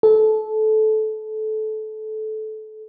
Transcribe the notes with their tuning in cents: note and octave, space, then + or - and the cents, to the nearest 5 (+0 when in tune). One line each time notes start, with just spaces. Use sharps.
A4 -20